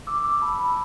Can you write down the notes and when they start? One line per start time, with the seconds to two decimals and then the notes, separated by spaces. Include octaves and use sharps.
0.07 D6 E6
0.24 D6 E6
0.42 A5 B5
0.59 A5 B5